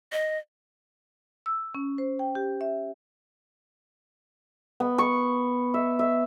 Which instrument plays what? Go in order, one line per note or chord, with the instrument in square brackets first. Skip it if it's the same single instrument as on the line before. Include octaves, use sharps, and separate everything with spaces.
[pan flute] D#5
[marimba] E6
C#4
C5
G5
G4
E5
[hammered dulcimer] B3
C#6
E5
E5